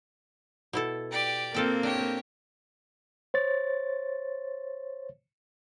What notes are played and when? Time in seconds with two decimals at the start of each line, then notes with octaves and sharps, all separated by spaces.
0.73 B2 E4 A4
1.11 G4 D5
1.54 A#3 C4 F4 A4 G5
1.83 D4 G4 C#5
3.34 C5 C#5 A6